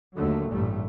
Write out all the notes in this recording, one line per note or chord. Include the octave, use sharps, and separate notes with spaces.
D#2 D3 F#3 A3
A1 G2 A#2 G3 A3